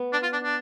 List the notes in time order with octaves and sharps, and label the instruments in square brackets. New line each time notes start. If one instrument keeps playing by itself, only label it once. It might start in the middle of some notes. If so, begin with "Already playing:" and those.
Already playing: [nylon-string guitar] B3
[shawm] D4
F4
D4
D4